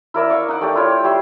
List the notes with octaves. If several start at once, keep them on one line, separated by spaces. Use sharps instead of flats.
E4 A#4 D5 E5
F5 C#6 D6
D#4 F#5 D6
A3 G4 D5
E4 F4 C#5
G3 E5 B5 C6